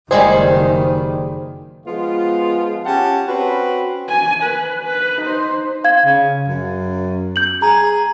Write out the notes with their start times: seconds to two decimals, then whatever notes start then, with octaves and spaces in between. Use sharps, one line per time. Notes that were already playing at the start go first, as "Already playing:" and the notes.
0.11 F#1 D#3 G3 G#3 G#4 C5
1.86 F3 G#3 B3 F4
2.85 C#4 G4 F#5 G5 A5
3.28 C4 C#4 F#4 B4
4.09 G#5
4.43 B4
4.84 B4
5.21 D#4 C5
5.84 F5 G#6
6.05 C#3
6.48 F#2
7.36 G6 F#7
7.62 G#4 A#5